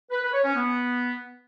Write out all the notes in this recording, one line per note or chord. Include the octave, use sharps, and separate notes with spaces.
B4
B4
C#5
C#4
B3